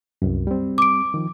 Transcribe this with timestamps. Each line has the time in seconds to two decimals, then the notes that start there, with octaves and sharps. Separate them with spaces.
0.22 C2 F#2
0.47 G3 C4
0.78 D6 D7
1.14 D#3 F3